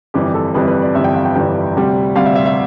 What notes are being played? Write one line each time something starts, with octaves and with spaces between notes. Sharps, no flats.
G1 F2 E3 G3 G4
A4
G1 F2 E3 G3 B4
B4
D5
G1 F2 E3 G3 E5
G5
F5
G5
G1 F2 E3 G3 G5
D2 C3 G3
D2 C3 G3 F5
E5
E5
E5